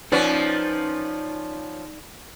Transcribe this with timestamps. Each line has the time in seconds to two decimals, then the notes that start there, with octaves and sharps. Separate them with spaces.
0.12 F3 B3 C#4 D#4 D5